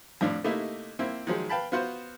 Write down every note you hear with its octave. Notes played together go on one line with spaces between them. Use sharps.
F2 A2 D4 F5
C3 A3 A#3 D#4 E4
A#3 C4 E4
D#3 F3 F#3 G#3
B4 F5 G5 A5 B5
B3 F4 F#4 C5